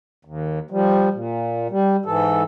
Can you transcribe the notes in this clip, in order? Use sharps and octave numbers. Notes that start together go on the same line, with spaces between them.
D#2
F3 G3
A#2
G3
G#2 E3 A4